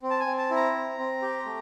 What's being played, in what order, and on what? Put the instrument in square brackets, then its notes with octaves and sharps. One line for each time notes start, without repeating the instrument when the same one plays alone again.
[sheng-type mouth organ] C4
A5
G#5
C4
A5
E4
A#5
C4
C4
G4
A3